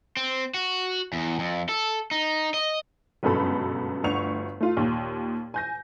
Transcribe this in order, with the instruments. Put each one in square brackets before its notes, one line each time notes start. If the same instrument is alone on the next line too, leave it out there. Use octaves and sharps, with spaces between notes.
[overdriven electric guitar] C4
F#4
E2
F2
A4
D#4
D#5
[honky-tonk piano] G1 C#2 F#2 B2 A4 B5
G1 D2 C#6 F7
A3 F4
D#2 A#2
G#5 G6 A#6